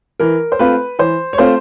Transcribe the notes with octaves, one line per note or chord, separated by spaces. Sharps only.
E3 A#4
C5
A3 C4 F4 B4
E3 C5
C#5
A3 C4 F4 C5